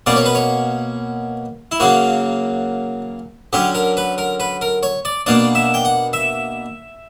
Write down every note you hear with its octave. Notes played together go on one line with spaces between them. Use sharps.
B2 A#3 C#4 D5
C#5
B4
C#5
E4
C#3 F#3 A#3 F#4
D3 F#3 C#4 G4
A#4
B4
A#4
B4
A#4
C#5
D5
B2 A#3 D4 D5
E5
G5
F#5
E5